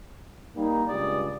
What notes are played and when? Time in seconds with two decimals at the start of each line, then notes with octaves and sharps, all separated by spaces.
0.55 G3 A#3 D#4
0.88 C#2 G2 G3 D5 D#6